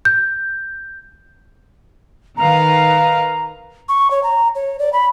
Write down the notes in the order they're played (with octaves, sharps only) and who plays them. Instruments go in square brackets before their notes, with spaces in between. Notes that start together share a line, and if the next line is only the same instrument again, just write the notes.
[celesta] G6
[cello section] D#3 B4 F5 [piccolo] A#5
[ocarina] C#6
C#5
A#5
C#5
D5
B5